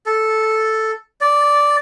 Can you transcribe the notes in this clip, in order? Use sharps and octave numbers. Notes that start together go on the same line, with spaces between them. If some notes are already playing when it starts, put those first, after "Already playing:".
A4
D5